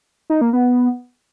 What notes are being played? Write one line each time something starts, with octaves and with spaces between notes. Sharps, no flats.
D#4
A#3
B3